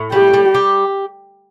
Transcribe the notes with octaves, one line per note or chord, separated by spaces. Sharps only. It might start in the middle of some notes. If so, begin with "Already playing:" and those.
Already playing: A2
G3 G4
G3
G4